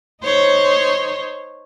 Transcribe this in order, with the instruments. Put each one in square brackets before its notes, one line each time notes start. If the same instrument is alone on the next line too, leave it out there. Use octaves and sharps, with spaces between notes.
[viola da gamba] D#4 C5 C#5